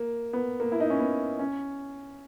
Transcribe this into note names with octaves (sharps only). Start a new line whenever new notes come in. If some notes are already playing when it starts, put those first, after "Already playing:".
Already playing: A#3
B3
A#3
E4
D#4
C#4
B3
C#4